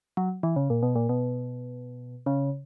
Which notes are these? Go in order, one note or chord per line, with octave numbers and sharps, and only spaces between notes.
F#3
E3
C#3
A#2
B2
A#2
B2
C#3